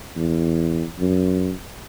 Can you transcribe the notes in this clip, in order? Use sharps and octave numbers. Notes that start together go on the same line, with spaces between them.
E2
F#2